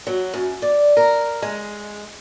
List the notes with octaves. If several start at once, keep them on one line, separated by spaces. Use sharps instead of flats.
F#3
F#2
D5
A#4
G#3